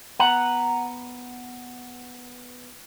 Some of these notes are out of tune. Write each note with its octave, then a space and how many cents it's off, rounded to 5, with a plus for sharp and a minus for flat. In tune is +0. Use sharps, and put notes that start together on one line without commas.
B3 +0 F#5 +0 A#5 +0